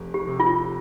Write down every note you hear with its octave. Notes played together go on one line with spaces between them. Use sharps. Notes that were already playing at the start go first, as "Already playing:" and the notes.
Already playing: F1
G4
C3
F4